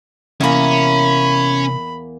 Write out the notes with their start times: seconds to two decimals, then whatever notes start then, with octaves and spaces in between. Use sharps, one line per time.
0.41 E2 C3 A#3 C#4 B5